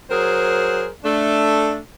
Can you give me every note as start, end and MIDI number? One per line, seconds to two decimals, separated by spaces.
0.11 0.88 54
0.11 0.88 68
0.11 0.88 70
0.11 0.88 72
1.04 1.79 57
1.04 1.79 62